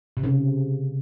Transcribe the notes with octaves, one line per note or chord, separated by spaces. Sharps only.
C3
C#3